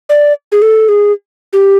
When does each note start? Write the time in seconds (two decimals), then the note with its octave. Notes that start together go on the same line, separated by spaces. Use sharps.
0.09 D5
0.52 G#4
0.62 A4
0.89 G#4
1.53 G4